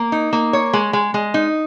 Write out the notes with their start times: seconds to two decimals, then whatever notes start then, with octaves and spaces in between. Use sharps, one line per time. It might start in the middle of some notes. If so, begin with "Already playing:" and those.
Already playing: A#3
0.12 D#4
0.33 A#3
0.53 C#5
0.73 G#3
0.93 G#3
1.14 G#3
1.34 D#4